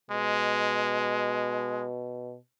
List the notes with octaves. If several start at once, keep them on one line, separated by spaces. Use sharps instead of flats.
B2 G#3